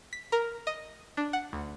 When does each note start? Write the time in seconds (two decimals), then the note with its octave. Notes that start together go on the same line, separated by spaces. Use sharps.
0.13 B6
0.32 A#4
0.67 D#5
1.17 D4
1.33 F#5
1.53 D2